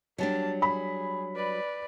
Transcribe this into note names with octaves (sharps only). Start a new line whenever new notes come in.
F#3 G3 A#3 D4 A5
G#4 B5
B4 D5